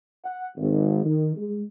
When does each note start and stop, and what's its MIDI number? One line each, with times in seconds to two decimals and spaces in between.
0.25 0.46 78
0.57 1.00 32
1.04 1.32 51
1.36 1.62 56